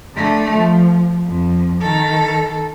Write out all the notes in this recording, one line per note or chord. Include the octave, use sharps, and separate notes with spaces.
D3 A3
F3
F2
D#3 A4